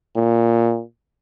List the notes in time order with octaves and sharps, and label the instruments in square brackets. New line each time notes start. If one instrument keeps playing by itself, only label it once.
[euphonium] A#2